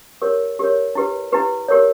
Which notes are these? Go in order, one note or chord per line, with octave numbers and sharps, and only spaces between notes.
G4 A#4 C#5
G4 A#4 C#5
E4 G4 B4
E4 G4 B4
G4 A#4 C#5